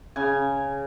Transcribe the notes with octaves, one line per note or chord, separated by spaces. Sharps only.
C#3 G#5